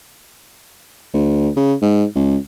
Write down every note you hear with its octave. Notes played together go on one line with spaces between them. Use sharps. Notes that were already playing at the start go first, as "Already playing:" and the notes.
D2
C#3
G#2
C#2